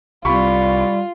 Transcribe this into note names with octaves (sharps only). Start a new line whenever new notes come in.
C2 G3 C4 F4 G4 B5 C#6